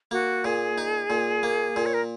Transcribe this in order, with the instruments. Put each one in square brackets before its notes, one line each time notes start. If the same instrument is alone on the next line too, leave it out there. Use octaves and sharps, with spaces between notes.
[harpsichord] A#3 [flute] F#4
[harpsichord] A#2 [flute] G#4
[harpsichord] D#4
A#2
A#3
A#2
[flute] C#5
A#4